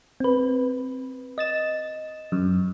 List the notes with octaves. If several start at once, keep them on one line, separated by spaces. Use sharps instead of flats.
C4 B4
D#5 A6 E7
F#2